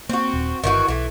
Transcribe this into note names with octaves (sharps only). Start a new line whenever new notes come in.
A#3 C4 F#4
D#1
G1 D#3 E3 F#4
B1 E3 A3